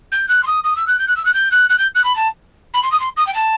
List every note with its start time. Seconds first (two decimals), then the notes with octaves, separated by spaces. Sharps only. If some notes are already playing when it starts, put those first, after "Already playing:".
0.12 G6
0.29 F#6
0.43 C6
0.47 D#6
0.64 D#6
0.76 E6
0.87 F#6
0.99 G6
1.08 F#6
1.16 E6
1.25 F#6
1.34 G6
1.51 F#6
1.69 F#6
1.78 G6
1.95 F#6
2.04 B5
2.15 A5
2.74 B5
2.82 C6
2.92 D#6
3.00 C6
3.17 D#6
3.27 G5
3.34 A5